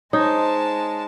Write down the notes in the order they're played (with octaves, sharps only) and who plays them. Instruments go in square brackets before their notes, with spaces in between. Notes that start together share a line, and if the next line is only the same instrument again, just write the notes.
[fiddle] G#3 A5 [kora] D#4 [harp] C5 C#5